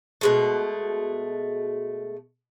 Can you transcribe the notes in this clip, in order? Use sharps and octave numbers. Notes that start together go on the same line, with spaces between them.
B2 G#3 A3